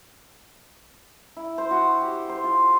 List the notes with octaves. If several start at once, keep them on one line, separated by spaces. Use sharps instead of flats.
E4
C5
F#4
G4
C5
F4